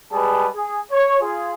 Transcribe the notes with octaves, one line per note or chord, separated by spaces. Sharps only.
G3 G#3 G#4 B4 G#5 A5
G#4
C#5
F4 G#4